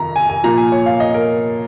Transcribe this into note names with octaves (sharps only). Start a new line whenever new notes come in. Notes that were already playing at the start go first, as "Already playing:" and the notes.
Already playing: F2 D#3 A#5
G#5
G#5
A#2 F3 A#5
G#5
C#5
F5
D#5
A#4